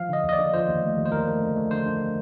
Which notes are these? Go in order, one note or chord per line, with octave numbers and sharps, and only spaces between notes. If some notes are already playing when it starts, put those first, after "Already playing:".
Already playing: F3 F5
D3 D#5
D#2
D#5
D5
D3
F3 C5
D#2
A3
D#2
C5
D#2 A#4
A3
D3
A3
D3 C5
D3